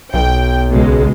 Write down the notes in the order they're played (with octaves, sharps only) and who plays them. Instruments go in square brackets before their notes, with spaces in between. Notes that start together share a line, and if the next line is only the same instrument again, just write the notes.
[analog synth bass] B1 [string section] G5
[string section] C#2 B2 G#3